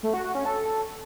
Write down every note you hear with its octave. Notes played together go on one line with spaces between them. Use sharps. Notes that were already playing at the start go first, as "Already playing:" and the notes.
A3
F#4
F#4
C#4
A4